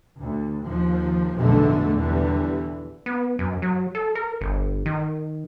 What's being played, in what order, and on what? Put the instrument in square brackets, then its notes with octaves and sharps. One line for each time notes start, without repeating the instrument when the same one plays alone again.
[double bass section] D2
D#2 F3
B1 F2 A2 D3 G#3 A3
E2 D3 E3 G3
[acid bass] B3
F#2
F#3
A4
A#4
G1
D#3